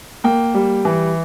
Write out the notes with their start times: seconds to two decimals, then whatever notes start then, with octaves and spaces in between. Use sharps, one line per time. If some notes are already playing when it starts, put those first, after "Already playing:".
0.24 A#3 G5
0.54 G3
0.85 E3